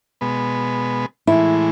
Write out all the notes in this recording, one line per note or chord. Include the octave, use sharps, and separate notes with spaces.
B2 G#3 B3
A2 E3 G#3 E4